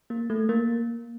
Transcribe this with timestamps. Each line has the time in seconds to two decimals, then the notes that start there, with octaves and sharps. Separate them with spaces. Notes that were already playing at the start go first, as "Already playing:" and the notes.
0.10 A#3
0.30 A3
0.49 A#3